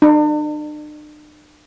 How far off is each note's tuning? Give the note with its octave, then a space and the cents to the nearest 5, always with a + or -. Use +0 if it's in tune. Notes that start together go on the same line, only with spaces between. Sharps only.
D4 +45